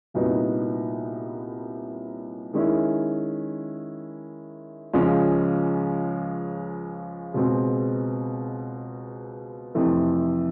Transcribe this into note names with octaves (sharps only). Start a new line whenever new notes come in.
C2 A#2 F#3 B3 D#4
D#3 G#3 C#4 E4
C#2 C#3 F3 G#3 C#4
C#2 B2 G#3 C4
F2 C3 E3 A3 C4